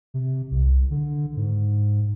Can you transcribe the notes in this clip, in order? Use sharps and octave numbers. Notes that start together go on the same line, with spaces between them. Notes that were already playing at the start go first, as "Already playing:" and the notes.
C3
C2
D3
G#2